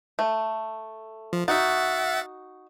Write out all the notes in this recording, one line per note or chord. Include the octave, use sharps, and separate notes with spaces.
A3
F3
D#4 F#4 E5 F#5 A6